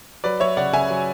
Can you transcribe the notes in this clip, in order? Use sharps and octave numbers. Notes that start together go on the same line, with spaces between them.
F#3 B4 D5
F#3 C#5 E5
C#3 D5 F#5
C#3 E5 G#5
F#3